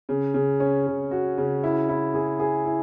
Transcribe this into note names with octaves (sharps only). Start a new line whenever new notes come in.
C#3
C#3
C#4
C#3
F#4
C#3
E4
E4
G#4
G#4
E4